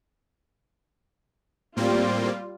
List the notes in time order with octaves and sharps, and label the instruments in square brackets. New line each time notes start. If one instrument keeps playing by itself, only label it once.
[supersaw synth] A2 A#3 C4 [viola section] G3 F4